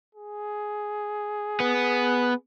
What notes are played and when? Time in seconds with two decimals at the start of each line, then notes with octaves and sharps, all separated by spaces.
0.15 G#4
1.60 B3